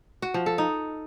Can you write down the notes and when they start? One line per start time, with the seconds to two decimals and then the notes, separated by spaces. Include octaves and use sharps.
0.22 F#4
0.34 F3
0.46 A4
0.58 D#4